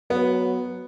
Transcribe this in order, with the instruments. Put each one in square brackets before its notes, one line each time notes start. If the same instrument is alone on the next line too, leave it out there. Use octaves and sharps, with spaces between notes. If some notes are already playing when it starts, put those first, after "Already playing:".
[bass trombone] F#3 [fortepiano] B3